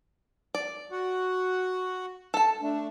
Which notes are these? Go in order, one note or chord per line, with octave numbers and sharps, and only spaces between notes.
D5
F#4 F#5
A4 A5
A3 D4